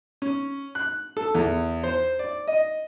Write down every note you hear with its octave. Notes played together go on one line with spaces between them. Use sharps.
C#4
F#6
A4
E2
C5
D5
D#5